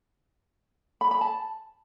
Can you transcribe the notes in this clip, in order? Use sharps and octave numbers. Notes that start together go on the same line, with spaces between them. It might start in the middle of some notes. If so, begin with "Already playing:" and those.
B5
B5
A5